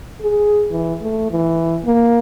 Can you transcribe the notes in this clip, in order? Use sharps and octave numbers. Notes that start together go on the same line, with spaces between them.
G#4
E3
A3
E3
A#3